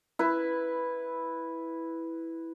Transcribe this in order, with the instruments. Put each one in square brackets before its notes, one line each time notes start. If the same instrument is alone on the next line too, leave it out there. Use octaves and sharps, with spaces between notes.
[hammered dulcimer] E4 B4